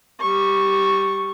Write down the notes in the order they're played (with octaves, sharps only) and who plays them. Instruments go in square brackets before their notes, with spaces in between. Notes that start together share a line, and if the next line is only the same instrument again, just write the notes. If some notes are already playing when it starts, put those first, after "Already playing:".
[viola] G3 C#6